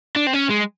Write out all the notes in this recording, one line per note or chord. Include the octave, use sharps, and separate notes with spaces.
D4
C4
C#4
G#3